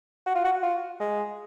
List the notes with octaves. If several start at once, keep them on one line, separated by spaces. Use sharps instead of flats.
F#4
F4
F#4
F4
G#3